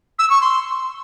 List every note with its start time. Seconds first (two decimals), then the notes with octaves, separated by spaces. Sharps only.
0.18 E6
0.29 C#6
0.41 C6